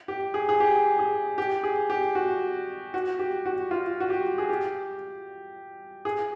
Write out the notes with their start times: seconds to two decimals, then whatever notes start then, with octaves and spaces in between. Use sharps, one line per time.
0.08 G4
0.34 G#4
0.49 G#4
0.60 G4
0.99 G#4
1.38 G4
1.64 G#4
1.90 G4
2.15 F#4
2.94 F#4
3.19 G4
3.46 F#4
3.71 F4
4.00 F#4
4.10 G4
4.38 G#4
4.49 G4
6.05 G#4